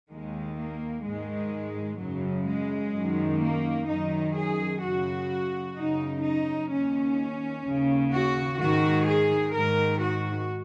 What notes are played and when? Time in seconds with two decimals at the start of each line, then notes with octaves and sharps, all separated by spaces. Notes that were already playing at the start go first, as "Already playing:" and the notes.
0.11 D#2 D#3 G#3
0.57 A#3
1.05 G#2 D#3 G#3
1.99 F#2 C#3 F#3
2.47 G#3
2.94 F#2 D#3
3.41 A#3
3.88 F#2 D#3 D#4
4.35 G#4
4.83 F#2 C#3 F#4
5.77 F#2 C#3 D#4
6.24 D#4
6.70 D#2 D#3 C#4
7.65 D#2 C#3
8.12 F#4
8.59 G#2 D#3 F#4
9.06 G#4
9.54 G#2 D#3 A#4
10.01 F#4